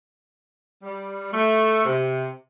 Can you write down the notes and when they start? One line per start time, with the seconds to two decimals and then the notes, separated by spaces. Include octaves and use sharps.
0.82 G3
1.32 A3
1.85 C3